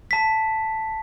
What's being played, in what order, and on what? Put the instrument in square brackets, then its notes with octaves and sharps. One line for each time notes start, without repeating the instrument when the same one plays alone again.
[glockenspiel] A5 B6